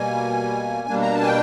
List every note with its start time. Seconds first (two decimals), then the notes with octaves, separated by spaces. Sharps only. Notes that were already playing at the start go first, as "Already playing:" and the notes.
Already playing: B2 G3 A#3 G#5
0.88 B2 G3 A#3 D4
1.02 A#5
1.15 A5
1.22 G#5
1.27 G5